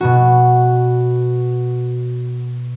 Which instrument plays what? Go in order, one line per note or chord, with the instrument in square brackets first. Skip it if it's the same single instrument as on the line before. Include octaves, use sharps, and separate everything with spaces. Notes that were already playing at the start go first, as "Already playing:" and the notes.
[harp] B2 B3 F#4